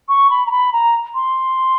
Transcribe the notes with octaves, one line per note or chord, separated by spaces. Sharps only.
C#6
B5
A#5
B5
A#5
C6